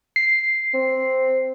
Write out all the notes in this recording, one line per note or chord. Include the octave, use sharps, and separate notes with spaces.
C7
C4